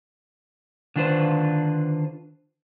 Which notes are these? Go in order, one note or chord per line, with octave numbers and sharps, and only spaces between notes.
D3 D#3 D4 F4 B4 C5